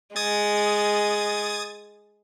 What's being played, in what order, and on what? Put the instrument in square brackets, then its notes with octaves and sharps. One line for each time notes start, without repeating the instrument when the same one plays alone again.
[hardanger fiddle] G#3 [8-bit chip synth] D#6 G#6 A6